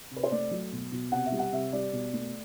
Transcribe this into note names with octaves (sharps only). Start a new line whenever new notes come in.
C3
B4
C5
A3 D5
F#3
B2
B2
C3 F#5
E5
G3
F#5
C3 E5
G3 D5
B2
A3